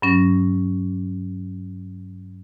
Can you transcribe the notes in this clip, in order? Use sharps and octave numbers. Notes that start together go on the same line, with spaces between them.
G2 F#3 C#4 A#6